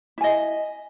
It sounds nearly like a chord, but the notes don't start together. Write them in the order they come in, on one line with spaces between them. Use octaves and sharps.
E4 G#5 D#5